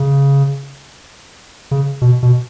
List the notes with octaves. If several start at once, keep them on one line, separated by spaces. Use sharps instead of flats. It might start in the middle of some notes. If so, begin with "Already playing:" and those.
Already playing: C#3
C#3
B2
B2